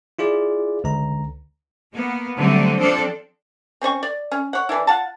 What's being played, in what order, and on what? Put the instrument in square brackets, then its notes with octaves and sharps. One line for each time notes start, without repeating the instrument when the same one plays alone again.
[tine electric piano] E4 F4 G#4 D5
C#2 D3 A#5
[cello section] A#3 B3
D3 F#3 G3 A3 C4
F3 C4 D4 A4 D5
[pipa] C4 C#4 C5 C#6
D5
C#4
C#5 F#5
E3 D4 E4
F4 F#5 A5